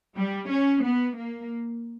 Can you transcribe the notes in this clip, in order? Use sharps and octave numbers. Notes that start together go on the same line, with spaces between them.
G3
C#4
B3
A#3